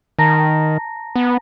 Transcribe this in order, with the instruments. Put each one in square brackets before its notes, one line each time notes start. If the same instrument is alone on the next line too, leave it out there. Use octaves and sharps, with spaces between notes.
[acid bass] D#3 [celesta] A5 A#5 A#6
[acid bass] B3